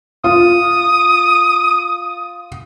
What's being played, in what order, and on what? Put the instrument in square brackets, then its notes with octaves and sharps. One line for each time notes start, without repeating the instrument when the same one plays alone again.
[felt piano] F4 [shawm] D#6